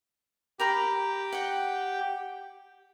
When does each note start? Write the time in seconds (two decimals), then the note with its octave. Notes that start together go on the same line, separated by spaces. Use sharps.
0.60 G4 A#4 A#5 B5
1.33 F#5 G5